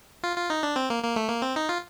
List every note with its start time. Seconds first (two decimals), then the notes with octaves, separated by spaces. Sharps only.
0.23 F4
0.37 F4
0.50 D#4
0.63 D4
0.76 C4
0.90 A#3
1.03 A#3
1.16 A3
1.29 A#3
1.42 C4
1.56 D#4
1.69 F4